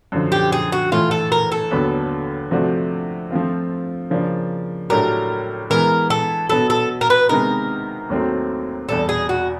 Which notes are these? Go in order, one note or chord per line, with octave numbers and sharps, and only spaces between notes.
F#2 D3 F3
G4
G#4
F#4
A2 E3 A3 F4
A4
A#4
A4
D#2 D3 F#3 B3
C3 F3 A3 D4 F#4
F3 A3 C4 F4
C#3 F3 A#3 D4
A2 F#3 A3 D4 G4 A#4
E3 G#3 B3 A#4
A4
B2 F#3 B3 A4
A4
A#4
B4
C3 D#3 G#3 B3 D#4 A#4
D#2 D#3 F#3 A3 C4
E2 B2 G3 A4
G#4
F#4